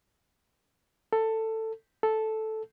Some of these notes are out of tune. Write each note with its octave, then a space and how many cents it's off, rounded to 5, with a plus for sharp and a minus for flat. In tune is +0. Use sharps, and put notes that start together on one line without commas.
A4 +15
A4 -5